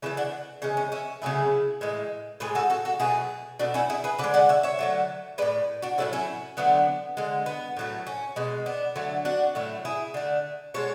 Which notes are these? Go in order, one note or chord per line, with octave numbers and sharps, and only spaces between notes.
C#3 E3 A3 C#4 E4
D4 F#4
C#3 E3 G#3 C#4
C#4
C#4 E4
C#3 F#3 A3 E4 G#4
A2 E3 G#3
A2 G#3 G#4 B4
F#4 A4
F#4 A4
F#4 A4
B2 F#3 A3 E4 G#4
B2 A3 D4 F#4
C#4 E4
E4 G#4
G#4 B4
D3 B4 D5
G#3
D5 F#5
C#5 E5
C#5 E5
D3 F#3 A3
A2 G#3 B4 D5
D4 F#4
A2 F#3 A3 C#4 E4
C#4 E4
D3 F#3 A3 B3 D4
D3 G#3
B3
A2 F#3 A3
C#4
B2 G#3
B3 D4
D3 F#3 A3
D4 F#4
A2 F#3 A3
E4 G#4
D3 A3
B2 G#3 A4 C#5